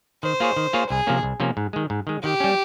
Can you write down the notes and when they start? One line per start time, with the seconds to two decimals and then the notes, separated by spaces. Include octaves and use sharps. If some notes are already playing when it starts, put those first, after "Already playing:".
0.23 D#3 C5
0.40 A#3 F4 G#4 C#5
0.57 D#3
0.73 A#3 F4 G#4 C#5
0.89 C2 G#4
1.07 C3 F3 A#3 C#4
1.23 C2
1.40 C3 F3 A#3 C#4
1.57 G#2
1.73 D#3 G#3
1.90 G#2
2.07 D#3 G#3
2.23 D#3 G4
2.40 G3 C#4